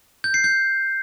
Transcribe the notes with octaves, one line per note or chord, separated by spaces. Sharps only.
G6
C7
G6